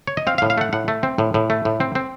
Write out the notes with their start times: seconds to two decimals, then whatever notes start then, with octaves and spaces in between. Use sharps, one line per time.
0.07 C#5
0.17 D#5
0.27 C4 F5
0.38 F5
0.42 A2
0.50 F5
0.58 A3 F#5
0.73 A2 F#5
0.88 A3
1.03 C4
1.18 A2
1.34 A2
1.50 A3
1.65 A2
1.80 C4
1.95 C4